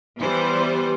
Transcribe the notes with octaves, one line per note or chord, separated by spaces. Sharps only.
E3 G3 B3 C5